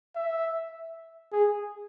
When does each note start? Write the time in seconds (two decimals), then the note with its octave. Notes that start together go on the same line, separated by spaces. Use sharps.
0.16 E5
1.32 G#4